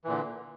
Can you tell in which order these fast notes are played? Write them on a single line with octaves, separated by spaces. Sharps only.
E3 A#2 D3